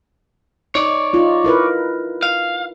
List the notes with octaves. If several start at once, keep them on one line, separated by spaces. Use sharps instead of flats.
D#4 C#5 D5
D#4 F4
E4 A#4 B4
F5